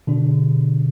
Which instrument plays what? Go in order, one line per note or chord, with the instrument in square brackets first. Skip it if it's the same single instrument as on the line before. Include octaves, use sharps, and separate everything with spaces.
[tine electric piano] B2 D3 D4